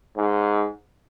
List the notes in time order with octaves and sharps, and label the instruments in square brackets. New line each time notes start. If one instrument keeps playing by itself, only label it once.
[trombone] G#2